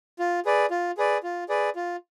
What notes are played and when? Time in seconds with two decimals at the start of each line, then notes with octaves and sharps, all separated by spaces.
0.19 F4
0.45 G#4 B4 D5
0.71 F4
0.98 G#4 B4 D5
1.23 F4
1.49 G#4 B4 D5
1.76 F4